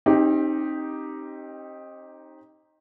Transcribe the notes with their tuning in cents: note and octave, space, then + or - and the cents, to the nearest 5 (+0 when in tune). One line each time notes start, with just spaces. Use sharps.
C4 +40 D#4 +0 G4 +0